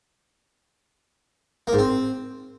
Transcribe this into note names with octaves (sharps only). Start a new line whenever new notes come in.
A#3
G#2
C4